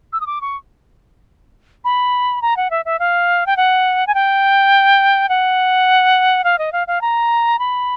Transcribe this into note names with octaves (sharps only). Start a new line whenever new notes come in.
E6
D#6
D6
C#6
B5
A#5
F#5
E5
E5
F5
G5
F#5
G#5
G5
F#5
F5
D#5
F5
F5
A#5
B5